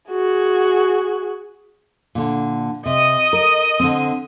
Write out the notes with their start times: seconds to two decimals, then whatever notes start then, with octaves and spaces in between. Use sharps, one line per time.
0.12 F#4 G#4
2.15 A#2 D3
2.86 C3 D#5 D#6
3.33 A#4
3.80 D3 C4